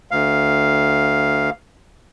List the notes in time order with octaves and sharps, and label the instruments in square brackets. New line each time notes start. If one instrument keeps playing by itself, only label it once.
[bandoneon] D2 F5